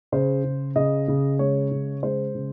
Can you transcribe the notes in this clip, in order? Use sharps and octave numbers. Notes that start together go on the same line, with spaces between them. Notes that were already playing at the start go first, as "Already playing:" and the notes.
C#3 C5
C#3
C#3 D#5
C#3
G#3 C#5
C#3
G#3 C5
C#3